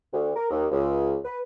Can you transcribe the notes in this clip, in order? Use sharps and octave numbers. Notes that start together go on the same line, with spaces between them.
D2
A#4
D#2
C#2
B4